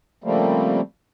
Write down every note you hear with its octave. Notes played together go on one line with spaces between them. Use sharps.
C#3 F3 G3 A3 A#3 C4